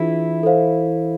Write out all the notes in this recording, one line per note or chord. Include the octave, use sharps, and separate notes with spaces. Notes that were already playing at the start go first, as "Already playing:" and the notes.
Already playing: E3 D4 E4 F4 G#4
A4 C5 F5